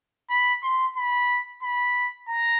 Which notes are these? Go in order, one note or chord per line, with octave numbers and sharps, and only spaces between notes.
B5
C6
B5
B5
A#5